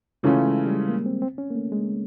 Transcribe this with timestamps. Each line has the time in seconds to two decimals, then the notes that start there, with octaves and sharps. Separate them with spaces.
0.23 C#3 E3 G#3 A3 C#4 F4
0.47 G#3
0.66 G3
0.73 G#3
0.89 A#3
1.06 C4
1.22 C4
1.38 C#4
1.50 A#3
1.55 A3
1.72 G#3